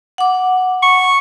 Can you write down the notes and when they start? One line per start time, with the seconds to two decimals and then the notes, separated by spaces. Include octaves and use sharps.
0.18 F#5 D6
0.83 C#6